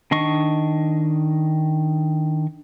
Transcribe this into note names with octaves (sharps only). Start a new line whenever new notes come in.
D#3 D4 D#5 C#6